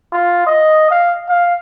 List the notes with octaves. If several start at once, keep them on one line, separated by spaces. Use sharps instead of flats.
F4
D#5
F5
F5